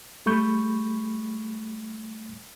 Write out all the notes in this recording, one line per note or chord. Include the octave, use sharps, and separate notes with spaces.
G3 A3 B5 C#6 G6